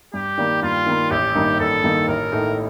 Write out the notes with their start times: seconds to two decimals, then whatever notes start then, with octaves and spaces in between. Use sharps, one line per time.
0.14 G2 G4
0.38 D#3 G3 A#3
0.62 G2 F4
0.86 D#3 G3 A#3
1.10 A1 G4
1.35 G2 D#3 A#3 D#4
1.59 A1 A4
1.84 G2 D#3 A#3 D#4
2.08 A1 A#4
2.32 A2 A3 D#4